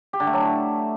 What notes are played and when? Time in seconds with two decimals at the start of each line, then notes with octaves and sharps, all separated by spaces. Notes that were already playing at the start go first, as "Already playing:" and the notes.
0.13 G4
0.20 D3
0.27 A3
0.33 F#3
0.40 E4